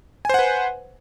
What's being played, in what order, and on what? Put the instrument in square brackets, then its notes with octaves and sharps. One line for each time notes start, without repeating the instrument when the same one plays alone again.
[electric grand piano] G#5
C5
F#5
B4